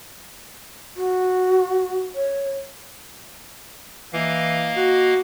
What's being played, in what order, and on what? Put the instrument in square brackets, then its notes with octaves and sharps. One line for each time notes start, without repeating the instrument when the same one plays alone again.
[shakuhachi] F#4
C#5
[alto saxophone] E3 [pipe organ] A#3 D#5 F5
[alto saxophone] F#4